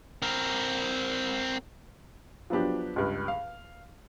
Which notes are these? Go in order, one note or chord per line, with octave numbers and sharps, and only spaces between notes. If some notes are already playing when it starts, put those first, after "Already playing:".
C4 A#4
F3 F#3 B3 D4 G4
C#2 G2
F5